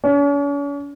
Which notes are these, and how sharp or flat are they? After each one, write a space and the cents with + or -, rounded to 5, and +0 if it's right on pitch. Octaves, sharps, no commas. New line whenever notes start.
C#4 +45